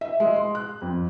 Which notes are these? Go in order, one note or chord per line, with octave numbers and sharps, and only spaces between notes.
E5
G#3
C6
F#6
F2